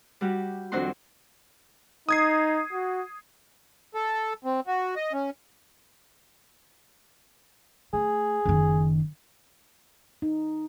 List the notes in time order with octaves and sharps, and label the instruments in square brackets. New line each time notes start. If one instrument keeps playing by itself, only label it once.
[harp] G3 F#4 G4
F2 D#3 C4 D4 F#4 C6
[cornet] D#4 [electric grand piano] D#6 G#6 C7
[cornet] F#4
[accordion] A4
C4
F#4
D#5
C#4
[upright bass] A3 [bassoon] G#4
[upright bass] F#1 D#3
[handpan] D#4